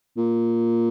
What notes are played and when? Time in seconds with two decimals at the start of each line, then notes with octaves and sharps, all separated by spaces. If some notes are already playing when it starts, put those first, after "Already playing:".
0.17 A#2